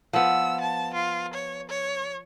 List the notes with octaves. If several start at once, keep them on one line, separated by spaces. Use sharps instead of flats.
F3 B3 E6
A5
F4
C#5
C#5